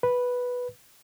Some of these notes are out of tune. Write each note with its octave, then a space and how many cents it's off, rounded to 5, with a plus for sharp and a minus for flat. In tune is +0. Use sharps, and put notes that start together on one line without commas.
B4 -5